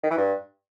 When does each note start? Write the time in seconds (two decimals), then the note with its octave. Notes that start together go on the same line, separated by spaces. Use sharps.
0.04 D#3
0.11 E3
0.17 G2